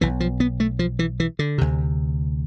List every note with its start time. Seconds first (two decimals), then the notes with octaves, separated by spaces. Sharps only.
0.01 B1 B2 E3
0.20 F3
0.40 B3
0.60 A3
0.79 F3
0.99 E3
1.20 E3
1.39 D3
1.58 D2 C3